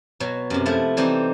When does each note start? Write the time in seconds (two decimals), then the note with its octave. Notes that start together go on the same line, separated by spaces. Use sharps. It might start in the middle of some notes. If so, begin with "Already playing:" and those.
0.20 B2 F#3
0.50 F#2 C3
0.66 F3 A3 E4
0.97 E3 G3 C4 D#4 G4 C5